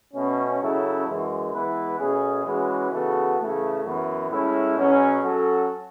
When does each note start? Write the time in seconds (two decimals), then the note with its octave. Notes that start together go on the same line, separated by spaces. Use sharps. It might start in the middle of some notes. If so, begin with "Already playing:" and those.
0.14 B2 A3 C#4
0.60 C#3 F#3 C#4 E4 A4
1.06 F#2 E3 G#3
1.53 E3 G#3 B3 E4 B4
1.98 B2 A3 C#4 G#4
2.44 E3 G#3 C#4 F#4 B4
2.91 C#3 E3 B3 F#4 A4
3.37 C#3 E3 A3
3.83 F#2 E3 B3
4.29 A2 G#3 C#4 E4
4.75 B2 F#3 C#4 G#4
5.22 F#3 C#4 F#4 A4